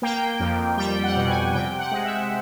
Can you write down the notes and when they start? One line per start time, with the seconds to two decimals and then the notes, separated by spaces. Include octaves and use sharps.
0.02 A#3 G5
0.40 F2
0.77 G3 G5
1.03 F#5
1.16 B2
1.28 G#5
1.53 C3 G5
1.78 F#5
1.91 G#3
2.04 E5